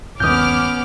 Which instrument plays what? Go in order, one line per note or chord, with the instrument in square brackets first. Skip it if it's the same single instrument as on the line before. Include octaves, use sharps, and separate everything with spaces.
[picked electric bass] G1 D#2 [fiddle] B3 C#4 [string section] D6 F6 [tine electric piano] D#6 G6